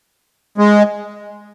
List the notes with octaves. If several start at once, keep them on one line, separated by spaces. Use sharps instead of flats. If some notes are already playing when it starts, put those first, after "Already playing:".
G#3